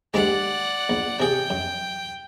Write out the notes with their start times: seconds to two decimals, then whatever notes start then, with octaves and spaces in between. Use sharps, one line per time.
0.14 D2 G3 G#3 D5 F#5
0.89 A#1
1.20 C3 G#4 G5
1.50 F#2